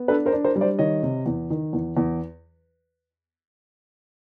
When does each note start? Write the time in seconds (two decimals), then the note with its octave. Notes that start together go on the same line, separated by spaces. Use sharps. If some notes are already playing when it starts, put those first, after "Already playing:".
Already playing: B3
0.08 D4 A4 B4
0.26 A#4 C5
0.32 D4
0.44 A#4 C5
0.56 G3
0.61 C5 D5
0.79 D#3 C#5 D#5
1.03 C3
1.26 E2
1.50 D#3
1.73 E2
1.97 E2